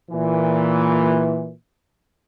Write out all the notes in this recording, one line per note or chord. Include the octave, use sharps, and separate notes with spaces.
A#2 E3